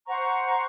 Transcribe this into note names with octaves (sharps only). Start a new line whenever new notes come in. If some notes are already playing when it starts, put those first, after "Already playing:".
C5 F#5 A#5 C#6